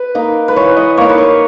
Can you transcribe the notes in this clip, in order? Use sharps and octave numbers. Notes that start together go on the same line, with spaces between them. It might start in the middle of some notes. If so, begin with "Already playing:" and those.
Already playing: B4
A#3 D#4
B4
E3 C#5
D#5
A#3 D#4 C#5
B4
C#5